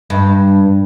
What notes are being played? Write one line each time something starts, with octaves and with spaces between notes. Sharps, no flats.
G2